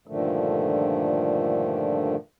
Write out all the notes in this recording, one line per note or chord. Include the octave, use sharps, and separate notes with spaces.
G2 A#2 D3 D#3 F3 A3